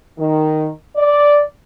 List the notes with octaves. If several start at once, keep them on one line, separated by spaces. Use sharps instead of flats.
D#3
D5